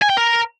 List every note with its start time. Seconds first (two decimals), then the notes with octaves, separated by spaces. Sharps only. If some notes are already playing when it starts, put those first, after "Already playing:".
0.02 G#5
0.10 G5
0.17 A#4